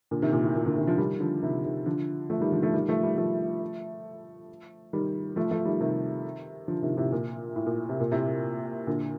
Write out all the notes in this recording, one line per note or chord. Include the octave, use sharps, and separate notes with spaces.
A#2 D3
C3 D#3
A#2
A2
A#2
A#2 D3
C3 D#3
D3 F3
D#3 G3
D3 F3
C3 D#3
C3 D#3
D3 F3
F3 A3
D#3 G3
D3 F3
F3 A3
D#3 G3
F3 A3
D#3 G3
F3 A3
D#3 G3
F3 A3
F3 A3
D#3 G3
C3 D#3
D3 F3
C3 D#3
A2 C3
A#2
A2
A#2
C3
A#2
A2 C3
A#2 D3